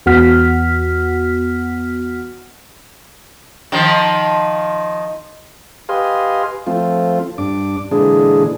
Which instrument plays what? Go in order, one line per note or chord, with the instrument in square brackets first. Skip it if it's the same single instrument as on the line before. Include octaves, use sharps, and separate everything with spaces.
[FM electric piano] E2 B3 F#4 F#5 F6 B6
[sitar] D#3 F3
[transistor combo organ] G4 B4 D#5 F5 G#5 C6
F3 A3 C4 F4
G2 D4 D6
A#2 D3 E3 G#3 D4 G#4